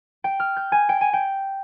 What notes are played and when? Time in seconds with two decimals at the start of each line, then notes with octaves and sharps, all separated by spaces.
0.24 G5
0.40 F6
0.57 G6
0.72 G#5
0.89 G5
1.01 G#5
1.13 G5